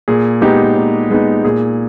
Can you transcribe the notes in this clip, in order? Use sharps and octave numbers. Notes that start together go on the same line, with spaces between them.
A#2 G#4
G#3 B3 D#4 G4
A#2
G#3 B3 D#4
A#2 G#4